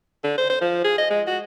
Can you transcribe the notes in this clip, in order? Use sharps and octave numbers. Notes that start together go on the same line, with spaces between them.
D3
C5
C5
F3
G#4
D#5
G#3
F#4